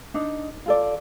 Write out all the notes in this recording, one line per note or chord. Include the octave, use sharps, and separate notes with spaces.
D4 D#4
F4 A4 D5